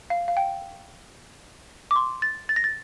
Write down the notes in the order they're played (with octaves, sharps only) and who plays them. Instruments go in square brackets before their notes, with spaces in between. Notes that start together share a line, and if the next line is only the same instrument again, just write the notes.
[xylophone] F5
F5
G5
D6
C6
A6
A6
A#6
A6